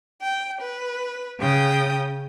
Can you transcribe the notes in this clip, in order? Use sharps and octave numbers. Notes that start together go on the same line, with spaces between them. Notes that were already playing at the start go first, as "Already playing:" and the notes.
G5
B4
C#3 G5 D#6